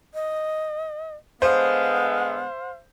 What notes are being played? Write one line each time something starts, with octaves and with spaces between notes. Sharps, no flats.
D#5
D3 G#3 B3 C5 F5